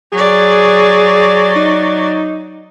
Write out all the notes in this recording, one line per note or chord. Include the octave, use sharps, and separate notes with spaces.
F#3 G#4 D5
D#4